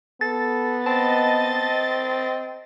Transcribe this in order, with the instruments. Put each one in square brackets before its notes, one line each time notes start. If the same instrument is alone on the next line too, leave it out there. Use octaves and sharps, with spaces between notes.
[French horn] B3 [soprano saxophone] A4 [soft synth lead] A6
[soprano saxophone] C4 [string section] D#5 A6 [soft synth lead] A5